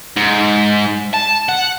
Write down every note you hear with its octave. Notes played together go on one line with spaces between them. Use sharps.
G#2
A5
F#5